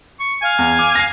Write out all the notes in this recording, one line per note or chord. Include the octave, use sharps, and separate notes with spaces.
C#6
F5 G#5
E2
D6
A#6 C7